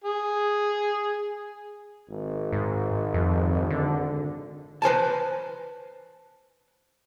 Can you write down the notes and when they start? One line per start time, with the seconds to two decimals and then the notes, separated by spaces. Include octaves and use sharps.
0.04 G#4
2.09 G#1
2.52 G#2
3.14 F2
3.70 D3
4.82 B4 C5 G#5 A5